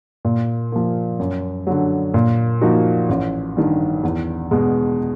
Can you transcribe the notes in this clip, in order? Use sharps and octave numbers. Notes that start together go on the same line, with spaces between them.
A#2
F3 A#3
F#2
D3 F#3
A#2
F3 A#3 D#4 F#4
A1
G2 D#3
E2
B2 G#3